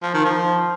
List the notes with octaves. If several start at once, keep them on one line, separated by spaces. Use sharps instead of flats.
F3
D#3
F3